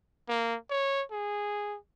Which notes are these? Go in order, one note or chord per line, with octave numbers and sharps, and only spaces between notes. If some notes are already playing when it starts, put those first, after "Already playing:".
A#3
C#5
G#4